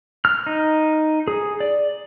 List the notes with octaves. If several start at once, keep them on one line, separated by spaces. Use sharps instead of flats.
F6
D#4
G#4
D5